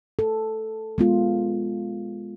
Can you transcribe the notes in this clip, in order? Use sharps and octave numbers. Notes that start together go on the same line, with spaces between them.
A4
G#3 B3 F4